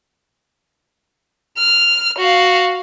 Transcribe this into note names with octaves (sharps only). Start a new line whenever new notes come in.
F6
F#4 F5